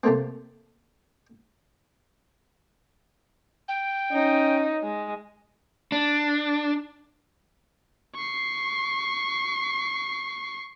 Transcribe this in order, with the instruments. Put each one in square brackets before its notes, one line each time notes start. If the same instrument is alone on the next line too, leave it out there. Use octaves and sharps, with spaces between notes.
[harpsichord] C3 A3 A#3 C4
[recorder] G5
[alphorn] C#4 [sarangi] D#4
[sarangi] G#3
[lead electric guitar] D4
[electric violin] C#6 C7